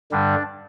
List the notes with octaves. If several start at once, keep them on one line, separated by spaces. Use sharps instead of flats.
G2 D3 G3 D4